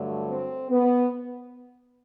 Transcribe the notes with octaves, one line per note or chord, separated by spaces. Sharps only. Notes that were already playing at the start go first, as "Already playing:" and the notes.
Already playing: G2 D3 F#3 A3
C4
B3